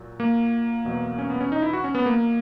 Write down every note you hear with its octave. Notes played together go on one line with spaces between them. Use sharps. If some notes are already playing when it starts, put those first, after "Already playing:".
Already playing: A#2 F#3
A#3
E2 B2 F#3
C#4
B3
C#4
D#4
E4
F#4
C#4
B3
A#3